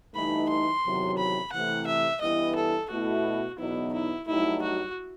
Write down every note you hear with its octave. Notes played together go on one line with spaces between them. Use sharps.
G2 E3 A3 D#4 B5
C6
E2 C3 D#3 F#3
B5
C3 E3 A3 F#5
E5
G2 E3 B3 E4 D#5
A4
B2 A3 E4 F#4
E2 B2 F#3 B3 D#4 E4
E4
G2 F#3 A3 D#4 E4
F#4